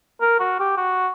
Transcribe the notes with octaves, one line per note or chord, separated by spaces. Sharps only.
A#4
F#4
G4
F#4